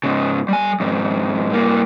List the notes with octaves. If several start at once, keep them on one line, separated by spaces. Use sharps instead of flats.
G#2 C#3
G3 G#5
F2 G#2
G2 A#3